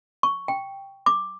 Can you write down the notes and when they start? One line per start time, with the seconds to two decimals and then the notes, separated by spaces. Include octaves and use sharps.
0.23 C#6
0.48 G5
1.06 D6